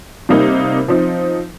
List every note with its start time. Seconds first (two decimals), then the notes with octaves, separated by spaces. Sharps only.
0.29 C3 G3 A#3 D#4
0.88 F3 C4 D#4